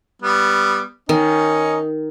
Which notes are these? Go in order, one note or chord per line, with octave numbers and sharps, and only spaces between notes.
G3 B3
D#3 C#4 D#4